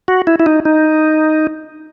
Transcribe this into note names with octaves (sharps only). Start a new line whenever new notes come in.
F#4
E4
E4
D#4
D#4